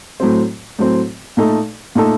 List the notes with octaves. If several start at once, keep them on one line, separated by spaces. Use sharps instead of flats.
A2 F#3 C4
A2 F#3 C4
A#2 A3 D#4 A4
A#2 A3 D#4 A4